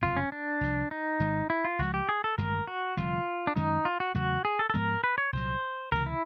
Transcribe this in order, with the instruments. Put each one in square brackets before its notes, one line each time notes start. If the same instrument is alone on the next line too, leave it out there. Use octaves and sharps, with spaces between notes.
[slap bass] F#1 F2 C3 [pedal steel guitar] F4
[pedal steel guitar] C#4
D4
[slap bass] C2 C3 F3
[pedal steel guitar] D#4
[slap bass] G#1 G#2 D#3 G#3
[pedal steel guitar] E4
F4
[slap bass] C#2 C3 F3 G#3 [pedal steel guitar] F#4
[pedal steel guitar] G4
G#4
A4
[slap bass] A1 G2 D#3 G#3 [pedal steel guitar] A#4
[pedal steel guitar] F#4
[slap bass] F1 F2 D3 G3 [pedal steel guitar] F4
[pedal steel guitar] D4
[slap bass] F#2 D#3 G#3 C#4 [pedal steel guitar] D#4
[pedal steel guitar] F4
F#4
[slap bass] E2 C#3 F#3 A3 [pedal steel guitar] F#4
[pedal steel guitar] G#4
A4
A4
[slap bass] G#2 F3 G#3 B3 [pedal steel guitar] A#4
[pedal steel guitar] B4
C#5
[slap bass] C2 A#2 F#3 [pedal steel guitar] C5
[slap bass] C#2 C3 E3 [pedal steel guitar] A#4
[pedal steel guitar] E4